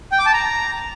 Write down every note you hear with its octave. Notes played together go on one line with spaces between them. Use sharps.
G5
D6
A5
A#5